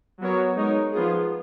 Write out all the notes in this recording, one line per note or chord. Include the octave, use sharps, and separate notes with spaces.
F#3 B3 F#4 A#4 C#5
G#3 D#4 A#4 C#5
F3 B3 F4 G#4